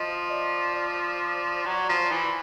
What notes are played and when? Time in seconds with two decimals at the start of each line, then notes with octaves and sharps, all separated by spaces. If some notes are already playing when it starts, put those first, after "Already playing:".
Already playing: F3 D#5
0.31 D5
0.76 D5
1.66 F#3
1.89 F3
2.11 E3